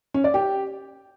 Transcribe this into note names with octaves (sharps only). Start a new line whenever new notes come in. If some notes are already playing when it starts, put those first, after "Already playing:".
C#4
D5
G4